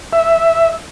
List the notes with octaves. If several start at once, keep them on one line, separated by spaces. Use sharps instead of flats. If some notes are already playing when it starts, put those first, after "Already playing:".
E5